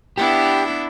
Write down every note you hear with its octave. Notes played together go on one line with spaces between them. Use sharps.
B3 D4 E4 G4